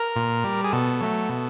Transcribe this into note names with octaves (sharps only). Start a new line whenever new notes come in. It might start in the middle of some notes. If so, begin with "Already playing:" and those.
Already playing: A#4
A#2
G3
G#4
B2 A4
F#3 A3
B2